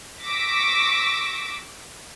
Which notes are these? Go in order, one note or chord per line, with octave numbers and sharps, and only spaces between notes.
C#6 D6 E6 A#6 B6 D7